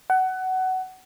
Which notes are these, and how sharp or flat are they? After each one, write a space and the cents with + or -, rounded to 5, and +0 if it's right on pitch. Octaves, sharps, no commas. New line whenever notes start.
F#5 +20